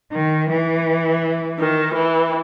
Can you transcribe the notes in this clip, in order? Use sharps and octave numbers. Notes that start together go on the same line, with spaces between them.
D#3
E3
D#3
E3